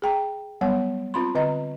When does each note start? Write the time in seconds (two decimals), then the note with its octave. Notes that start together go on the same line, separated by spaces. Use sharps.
0.02 G#4 G5 A#5
0.61 F#3 G3 B3 C#5 F#5
1.14 C4 F4 B5 C6
1.35 D3 C4 D#5 A#5